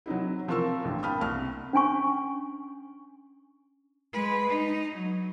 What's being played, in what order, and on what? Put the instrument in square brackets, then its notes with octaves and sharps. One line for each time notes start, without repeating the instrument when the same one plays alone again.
[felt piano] F#3 C4 D#4 E4
E3 F3 C4 A#4 C#6 E6
A1 G2
F5 G5 A5 B5 D#6 F6
C2 C3 C#6 F6
[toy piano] C#4 D4 G#5 C#6
[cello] G#3 B4
D#4
F#3